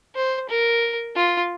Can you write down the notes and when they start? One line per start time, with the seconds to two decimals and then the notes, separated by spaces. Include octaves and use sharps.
0.15 C5
0.49 A#4
1.16 F4